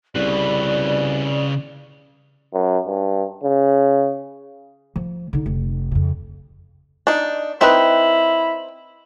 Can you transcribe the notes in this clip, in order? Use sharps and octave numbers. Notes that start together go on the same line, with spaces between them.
C2 C#3 B4 D5
F#2
G2
C#3
F3
D3 D#4
F1
F2 C#3
D4 D#4
C4 D#4 E4 B4